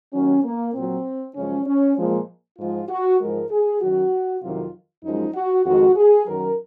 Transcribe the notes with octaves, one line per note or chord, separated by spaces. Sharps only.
D#2 D#3 F#3 C#4
A#3
A#2 F#3 C4
F#2 C#3 F3 G#3 C#4
C#4
A#2 F3 G#3
G#2 F3 G#3 F4
F#4
G#2 F3 G#3 A#4
G#4
F#2 D#3 F#3 F#4
F2 C3 D#3 F#3 F4
F#2 F3 G#3 D#4
F#4
F2 D#3 G#3 F#4
G#4
F#2 D#3 F#3 A#4